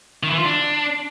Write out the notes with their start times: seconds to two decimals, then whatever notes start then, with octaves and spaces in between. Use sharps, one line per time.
0.23 D#3
0.30 E3
0.37 F4
0.45 D4